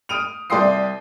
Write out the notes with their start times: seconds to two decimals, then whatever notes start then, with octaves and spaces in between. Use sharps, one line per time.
0.09 D#6 F6 D7 D#7 F7
0.50 C2 D5 G5 C6 D#6 C7